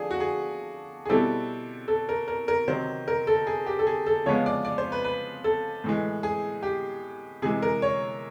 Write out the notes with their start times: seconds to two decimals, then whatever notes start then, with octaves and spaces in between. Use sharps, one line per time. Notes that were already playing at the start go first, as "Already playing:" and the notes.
Already playing: F3 A3 D4 G#4
0.11 F#4
0.20 G#4
1.05 G#4
1.09 B2 G3 C4 E4 A4
1.88 A4
2.09 A#4
2.28 A#4
2.48 A#4
2.68 C3 D#3 F#3 C5
3.08 A#4
3.27 A4
3.47 G#4
3.66 G4
3.79 A4
3.87 G#4
4.06 A4
4.26 C#3 F3 G#3 B3 C#5
4.46 D5
4.65 D5
4.78 C5
4.92 B4
5.04 B4
5.44 A4
5.84 A2 E3 G#3
6.23 G#4
6.63 G4
7.42 C3 E3 G#3 G#4
7.62 A#4
7.82 C#5